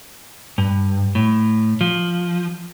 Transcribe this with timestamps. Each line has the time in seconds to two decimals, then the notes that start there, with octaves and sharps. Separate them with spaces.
0.58 G2
1.15 A2
1.81 F3